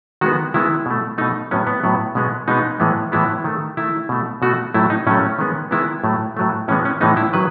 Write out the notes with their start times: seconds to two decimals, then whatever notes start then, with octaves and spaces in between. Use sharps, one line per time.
0.21 D#3 G#3 B3 F#4
0.54 D#3 G#3 B3 E4
0.86 B2 A3
1.18 B2 A3 D#4
1.51 A2 F#3 B3 C#4
1.67 B3
1.84 A2 F#3 B3
2.15 B2 G#3 B3
2.48 B2 G#3 B3 D#4
2.80 A2 E3 G#3 B3
3.12 A2 E3 G#3 B3 E4
3.44 D#3 A3
3.77 D#3 A3 E4
4.09 B2 A3
4.42 B2 A3 F#4
4.74 A2 F#3 A3 E4
4.90 D#4
5.07 A2 F#3 A3 C#4
5.39 D#3 G#3 B3
5.71 D#3 G#3 B3 E4
6.04 A2 F#3 A3
6.37 A2 F#3 A3
6.68 A2 E3 G#3 B3 C#4
6.85 C#4
7.01 A2 E3 G#3 B3 D#4
7.17 E4
7.33 D#3 F#3 B4